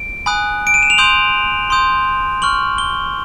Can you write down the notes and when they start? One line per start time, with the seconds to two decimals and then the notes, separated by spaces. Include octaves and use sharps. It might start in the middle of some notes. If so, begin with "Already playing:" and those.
Already playing: D7
0.26 G#5 B5 D#6 F#6
0.67 D7
0.74 D#7
0.83 E7
0.90 F7
0.98 C6 D#6 G6 F#7
1.70 C6 D#6 G6
2.42 C#6 F6 F#7
2.78 G7